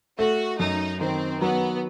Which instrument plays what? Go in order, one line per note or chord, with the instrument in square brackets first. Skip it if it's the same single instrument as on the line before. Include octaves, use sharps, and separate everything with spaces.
[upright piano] A3 [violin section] F#4
[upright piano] F#2 [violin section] D#4
[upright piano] D#3 [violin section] C4
[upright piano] F#3 [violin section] B3